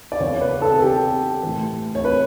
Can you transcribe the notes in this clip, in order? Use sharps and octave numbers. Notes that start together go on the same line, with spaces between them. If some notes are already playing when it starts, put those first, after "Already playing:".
D5
E2 C#3 E3 C#5
B4
A4
A4
G4
A2 E3
C#5
B4